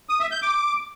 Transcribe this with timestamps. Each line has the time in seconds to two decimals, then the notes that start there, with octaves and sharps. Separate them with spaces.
0.09 D#6
0.20 E5
0.31 G6
0.42 D6